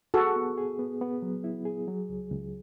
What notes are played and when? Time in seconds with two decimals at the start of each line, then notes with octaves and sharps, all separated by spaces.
0.14 F#4 G#4 A4
0.36 B3
0.58 G#4
0.79 B3
1.01 B3
1.22 F#3
1.44 E4
1.65 G#4
1.88 F#3
2.09 C#2
2.31 C#2